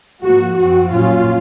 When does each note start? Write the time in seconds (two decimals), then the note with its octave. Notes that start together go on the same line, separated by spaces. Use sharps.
0.24 G#2 F3 A#3 F#4
0.58 F#2 F3 C4 F#4
0.92 A#2 F#3 C#4 F4